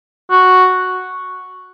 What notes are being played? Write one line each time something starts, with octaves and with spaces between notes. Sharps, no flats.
F#4